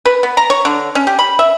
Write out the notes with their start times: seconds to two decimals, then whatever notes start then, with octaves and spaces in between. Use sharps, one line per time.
0.05 B4
0.23 B3
0.37 A#5
0.50 C#5
0.65 D3
0.95 C#4
1.07 G4
1.19 B5
1.39 E5